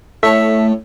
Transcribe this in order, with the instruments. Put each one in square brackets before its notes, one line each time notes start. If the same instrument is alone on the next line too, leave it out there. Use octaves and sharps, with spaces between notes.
[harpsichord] A2 C#5 A5 [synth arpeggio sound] A3 [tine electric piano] E5